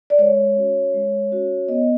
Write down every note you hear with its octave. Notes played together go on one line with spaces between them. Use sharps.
D5
G#3 C#5
C#4 F#4
G#3
C#4 F#4
B3 D#5